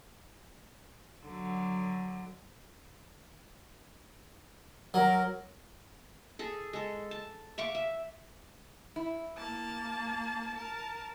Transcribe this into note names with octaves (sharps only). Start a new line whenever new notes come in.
D3 F#3
F#3 A#4
G#4 A4
G#3 A4
A5
E5 F5 C#6 D6
E5
E4
A#3 A5
A#4 A5